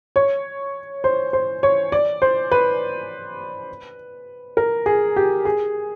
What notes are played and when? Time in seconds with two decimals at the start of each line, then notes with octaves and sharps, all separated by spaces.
0.16 C#5
1.04 C5
1.33 C5
1.63 C#5
1.92 D5
2.22 C5
2.52 B4
4.57 A#4
4.86 G#4
5.16 G4
5.45 G#4